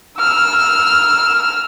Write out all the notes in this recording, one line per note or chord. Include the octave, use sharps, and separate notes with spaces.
E6 F6